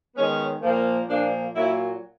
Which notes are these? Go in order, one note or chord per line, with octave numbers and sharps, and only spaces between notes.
D#3 G#3 B3 C#4
A#2 F3 A#3
A#2 F3 A#3 D4
A#2 F#3 A#3 E4